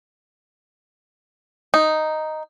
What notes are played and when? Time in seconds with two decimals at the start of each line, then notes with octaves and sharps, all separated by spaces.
1.74 D#4